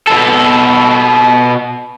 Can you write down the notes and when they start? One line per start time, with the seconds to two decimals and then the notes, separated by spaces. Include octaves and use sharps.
0.07 B2 A4